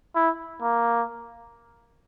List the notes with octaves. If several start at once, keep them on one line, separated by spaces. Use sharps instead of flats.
E4
A#3